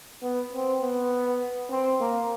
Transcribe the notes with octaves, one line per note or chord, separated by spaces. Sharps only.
B3
C4
B3
C4
A#3